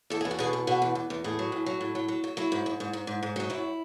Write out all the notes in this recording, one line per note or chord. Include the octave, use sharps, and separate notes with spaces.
E2 A4
E2 G#4
F#4
B2 G#4
E2
B2 F#4
E2
E2
E2
A2 G#4
F#3
A2
F#3
A2
F#3
F#3
F#3
F#3 E4
G#2
G#2
G#2
G#2
G#2
G#2
F#3 D#4
F#2 E4